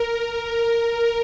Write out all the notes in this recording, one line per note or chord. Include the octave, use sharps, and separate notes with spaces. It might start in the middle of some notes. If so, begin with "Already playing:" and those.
Already playing: A#4
A#4